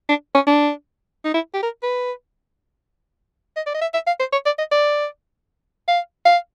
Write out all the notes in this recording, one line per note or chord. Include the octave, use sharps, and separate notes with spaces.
D4
C#4
D4
D#4
E4
G4
A#4
B4
D#5
D5
D#5
E5
E5
F5
C5
C#5
D5
D#5
D5
F5
F5